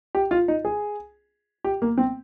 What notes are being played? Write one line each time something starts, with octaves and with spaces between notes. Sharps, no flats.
G4
F4
D#4
G#4
G4
A#3
C4